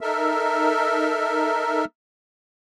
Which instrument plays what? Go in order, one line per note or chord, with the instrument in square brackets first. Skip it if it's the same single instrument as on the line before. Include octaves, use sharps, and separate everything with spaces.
[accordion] D#4 A4 A#4 E5